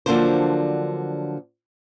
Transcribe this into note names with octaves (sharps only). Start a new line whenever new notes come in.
D3 F3 F#3 A#3 D4 C5